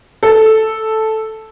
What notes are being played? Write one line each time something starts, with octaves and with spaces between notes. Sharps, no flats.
A4